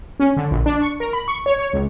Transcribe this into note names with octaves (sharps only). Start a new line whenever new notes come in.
C#4
D3
A#1
D4
C#6
A#4
B5
C#6
C#5
C#5
C#2